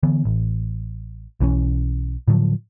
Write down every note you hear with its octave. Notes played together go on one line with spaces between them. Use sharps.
D3 E3 B3
A1
B1 E3 F3 C#4
A2 D3 F3 F#3